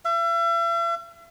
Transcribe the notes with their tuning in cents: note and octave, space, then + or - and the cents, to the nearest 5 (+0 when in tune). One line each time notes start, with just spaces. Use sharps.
E5 +40